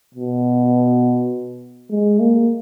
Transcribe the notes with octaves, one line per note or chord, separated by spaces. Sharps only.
B2
G#3
A#3